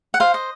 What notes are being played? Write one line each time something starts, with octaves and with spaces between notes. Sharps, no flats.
F#5
C5 F5
D#5